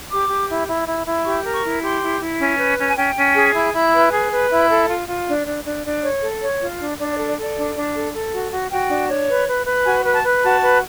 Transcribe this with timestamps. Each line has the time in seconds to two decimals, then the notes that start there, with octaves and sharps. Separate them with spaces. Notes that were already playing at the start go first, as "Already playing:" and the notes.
0.10 G4 D6
0.29 G4
0.48 E4
0.67 E4
0.87 E4
1.06 E4
1.25 G4 C#6
1.44 A#4
1.53 C#6
1.63 E4
1.82 G4 C6
2.02 E4
2.20 E4
2.40 C#4
2.59 B4
2.79 C#4
2.88 G#5
2.97 C#4 G5
3.16 C#4
3.35 G#4
3.54 E4
3.74 E4
3.93 B4
4.12 G#4
4.31 B4
4.51 E4
4.70 A4
4.88 F4
5.08 F4
5.27 D4
5.45 D4
5.64 D4
5.84 D4
6.03 C#5
6.22 A4
6.41 C#5
6.60 F4
6.79 D4
6.98 D4 D5
7.12 D5
7.17 A4
7.27 D5
7.37 A4
7.42 D5
7.56 D4
7.75 D4
7.94 A4
8.13 A4
8.33 F#4
8.52 F#4
8.70 F#4 G5
8.89 D4
9.09 C#5
9.29 B4
9.47 B4
9.66 B4
9.85 F#4 G#5
10.05 B4
10.14 A5
10.23 B4
10.43 F#4 A5
10.62 B4